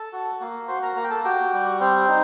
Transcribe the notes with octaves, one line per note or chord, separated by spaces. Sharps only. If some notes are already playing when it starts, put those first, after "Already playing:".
Already playing: A4 A5
F#4
A#3
F#4 C5 C6
A#4 A#5
A#3 A#4 A#5
G5
A4 A5
F#4 G4 G5
G3
C4 C5
D#4